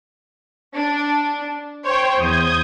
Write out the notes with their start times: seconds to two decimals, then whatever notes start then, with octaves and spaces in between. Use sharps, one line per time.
0.76 D4
1.84 C5 C#5 G5
2.20 E2 D#6 G6 G#6